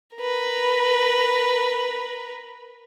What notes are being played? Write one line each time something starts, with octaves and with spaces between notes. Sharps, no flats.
A#4 B4